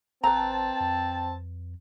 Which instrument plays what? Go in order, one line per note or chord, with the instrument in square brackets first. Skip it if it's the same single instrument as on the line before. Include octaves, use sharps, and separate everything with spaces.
[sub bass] A1 [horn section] C4 A5 [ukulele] B4 A#5
[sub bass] F2